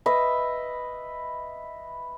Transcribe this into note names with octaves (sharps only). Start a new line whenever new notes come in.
B4 D#5 E5